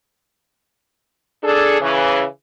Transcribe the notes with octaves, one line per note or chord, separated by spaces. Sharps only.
D4 G#4 A4
C#3 E3